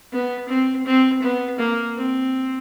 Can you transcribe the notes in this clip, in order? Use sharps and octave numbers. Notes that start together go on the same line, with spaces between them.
B3
C4
C4
B3
A#3
C4